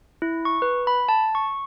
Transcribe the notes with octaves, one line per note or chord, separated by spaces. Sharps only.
E4
C#6
B4
B5
A5
C#6